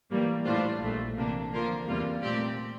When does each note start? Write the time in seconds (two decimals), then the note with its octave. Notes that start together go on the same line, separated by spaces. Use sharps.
0.11 A2 E3 G3 A#3
0.45 A2 G3 D4 F4 C5
0.81 A#1 A#2 A3
1.16 C3 E3 A#3 D4
1.52 D3 F3 A#3 F4 A#4
1.86 E2 C3 G3 A#3 F4
2.22 A#2 A3 C4 G4 D5